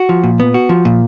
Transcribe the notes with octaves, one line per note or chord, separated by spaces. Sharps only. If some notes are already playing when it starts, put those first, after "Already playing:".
Already playing: F#4
F3
A#2
B3
F#4
F3
A#2